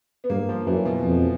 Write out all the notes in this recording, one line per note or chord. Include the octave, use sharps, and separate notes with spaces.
B3
G2 A#3
F3
F#2 E3
B2
F2